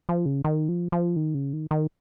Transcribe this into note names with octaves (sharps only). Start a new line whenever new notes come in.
F3
C#3
D#3
F3
F3
D#3
C#3
D#3
D#3